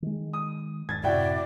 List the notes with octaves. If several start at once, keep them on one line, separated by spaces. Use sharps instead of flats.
D#3 G#3
D#6
E1 G#2 G#6 A6
F#2 A2 C3 E4 F#4 D5 G5